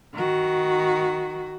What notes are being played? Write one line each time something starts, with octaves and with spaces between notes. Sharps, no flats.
D#3 F#4